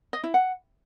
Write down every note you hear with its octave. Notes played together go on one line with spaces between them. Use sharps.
D#5
E4
F#5